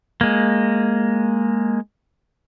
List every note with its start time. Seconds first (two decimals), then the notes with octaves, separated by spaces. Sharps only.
0.21 G#3 A#3